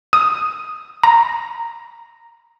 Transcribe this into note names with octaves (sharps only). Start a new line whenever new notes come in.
D#6
A#5